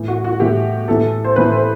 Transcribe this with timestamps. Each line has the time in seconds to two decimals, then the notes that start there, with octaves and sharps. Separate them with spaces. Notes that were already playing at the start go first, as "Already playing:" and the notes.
Already playing: A2 E3
0.08 F#4
0.24 F#4
0.40 A2 E3 G4
0.88 A2 E3 A4
1.24 C5
1.36 A2 E3 B4
1.52 C5